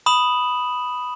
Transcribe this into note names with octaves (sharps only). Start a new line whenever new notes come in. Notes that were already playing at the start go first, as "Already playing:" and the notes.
B5 D#6 E7 F#7